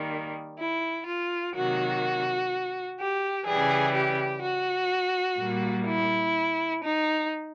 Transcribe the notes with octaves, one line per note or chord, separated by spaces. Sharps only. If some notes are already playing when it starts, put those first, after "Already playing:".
Already playing: D#3 G3 A#3
E4
F4
C3 D#3 F#3 A#3 F#4
G4
C#3 E3 G3 G#4
G4
F#4
A#2 G3 A#3
E4
D#4